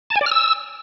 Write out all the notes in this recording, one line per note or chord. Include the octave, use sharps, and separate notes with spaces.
A5
G#5
D5
F6
E6